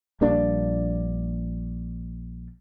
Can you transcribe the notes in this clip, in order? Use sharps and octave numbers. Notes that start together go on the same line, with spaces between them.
A#1 G3 A#3 D4